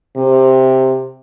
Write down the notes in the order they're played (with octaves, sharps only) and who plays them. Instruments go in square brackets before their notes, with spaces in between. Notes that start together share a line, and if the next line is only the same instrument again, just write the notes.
[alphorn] C3